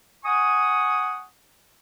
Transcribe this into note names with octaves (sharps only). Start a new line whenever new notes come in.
F#5 G#5 C#6 D#6